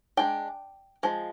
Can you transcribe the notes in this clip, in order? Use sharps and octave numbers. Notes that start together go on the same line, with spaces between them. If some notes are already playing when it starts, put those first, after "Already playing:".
G#3 D4 G5
F3 G#3